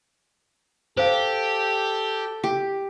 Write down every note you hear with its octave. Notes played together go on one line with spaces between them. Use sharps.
G4 A4 C5 F5
G4